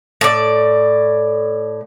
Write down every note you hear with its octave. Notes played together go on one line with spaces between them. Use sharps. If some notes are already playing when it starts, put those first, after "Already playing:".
A2 D5